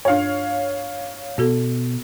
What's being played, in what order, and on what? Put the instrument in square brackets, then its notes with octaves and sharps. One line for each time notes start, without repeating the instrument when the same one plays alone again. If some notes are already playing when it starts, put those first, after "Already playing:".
[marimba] G2 D4 [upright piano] C#5 F5
[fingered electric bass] B2 [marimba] B3 F#4 A4